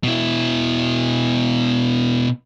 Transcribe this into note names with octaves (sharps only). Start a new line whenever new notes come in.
B2 E4